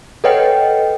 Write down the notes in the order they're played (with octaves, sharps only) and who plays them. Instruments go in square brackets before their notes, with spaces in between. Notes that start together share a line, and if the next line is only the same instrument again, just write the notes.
[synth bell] A4 B4 C#5 D#5 F#5 G5